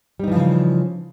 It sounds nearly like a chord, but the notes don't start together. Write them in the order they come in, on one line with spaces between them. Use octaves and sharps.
G3 D#4 E3 F3 C#3